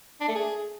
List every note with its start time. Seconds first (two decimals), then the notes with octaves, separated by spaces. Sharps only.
0.21 D4
0.28 A3
0.35 G#4